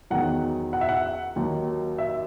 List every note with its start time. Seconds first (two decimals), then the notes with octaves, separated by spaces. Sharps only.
0.10 E2 D#3 F#3 F#5
0.73 F#5
0.81 E5
0.89 F#5
1.36 D#2 D#3 F#3
1.98 E5